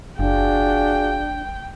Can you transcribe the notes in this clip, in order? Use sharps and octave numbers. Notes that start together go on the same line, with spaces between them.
F#1 D4 F4 F#4 G#4 G5